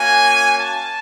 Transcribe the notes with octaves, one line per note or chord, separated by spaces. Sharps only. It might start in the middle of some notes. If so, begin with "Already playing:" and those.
Already playing: A#3 C#4 F#4 G#5
A5